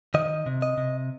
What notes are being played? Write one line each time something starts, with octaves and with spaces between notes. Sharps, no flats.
D#3 D#5
C3
D#5
C3